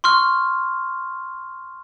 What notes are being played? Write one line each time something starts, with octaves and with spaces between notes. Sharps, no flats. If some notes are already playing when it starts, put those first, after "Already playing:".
C6 C#6 F6